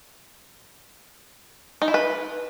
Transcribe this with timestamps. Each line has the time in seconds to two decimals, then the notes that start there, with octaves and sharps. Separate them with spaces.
1.82 D#4
1.88 E4
1.94 B4